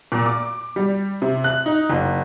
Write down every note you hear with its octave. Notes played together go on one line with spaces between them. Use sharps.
A#2
D6
G3
C3
F#6
D#4
F#1